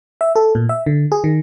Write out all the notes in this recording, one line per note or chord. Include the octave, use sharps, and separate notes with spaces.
E5
A4
A#2
E5
D3
G#4
D#3